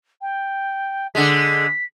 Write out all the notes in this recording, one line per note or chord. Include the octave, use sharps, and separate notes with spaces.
G5
D3 G#3 B6